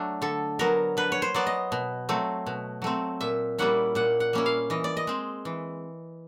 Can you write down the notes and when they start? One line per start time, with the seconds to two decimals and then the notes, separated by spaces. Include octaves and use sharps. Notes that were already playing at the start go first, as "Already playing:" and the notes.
Already playing: F#3 A3 D4
0.22 D3 A4
0.59 F#3 B3 A#4
0.97 D3 B4
1.12 C#5
1.22 C5
1.34 F#3 B3 D5
1.47 D#5
1.72 B2
2.09 F#3 A3 C4
2.46 B2
2.82 F#3 A3 C4
3.21 A#2 E5
3.58 G3 A#3 C#4 E4 F#5
3.95 A#2 F#5
4.20 F#5
4.33 G3 A#3 C#4 E4
4.46 F5
4.70 E3 D#5
4.84 D5
4.97 D#5
5.07 G#3 C4
5.45 E3